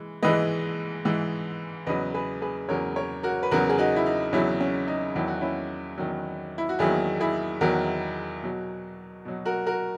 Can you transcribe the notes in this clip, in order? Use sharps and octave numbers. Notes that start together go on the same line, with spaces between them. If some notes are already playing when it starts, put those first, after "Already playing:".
Already playing: E3 G#3
G#2 E3 G#3 B4 D#5
G#2 E3 G#3
E2 C#3 F#3 B4 D#5
G#4 B4
G#4 B4
E2 C#3 F#3 A#4 C#5
A#4 C#5
F#4 A#4
B4
E2 C#3 F#3 F#4 A#4
G#4
D#4 F#4
E4
D#4
E2 C#3 F#3 C#4 E4
C#4
D#4
E2 D#3 F#3 E4
F#4
C#4 E4
E2 D#3 F#3
E4
F#4
E2 D#3 F#3 E4 G#4
E4 G#4
E2 D#3 F#3 F#4 A#4
B2 F#3
B2 F#3
F#4 A#4
F#4 A#4